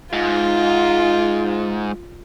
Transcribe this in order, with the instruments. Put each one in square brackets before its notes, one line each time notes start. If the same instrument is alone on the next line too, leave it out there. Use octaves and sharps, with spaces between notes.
[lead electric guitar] G#2 [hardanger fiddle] F4